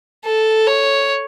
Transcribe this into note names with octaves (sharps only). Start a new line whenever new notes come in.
A4
C#5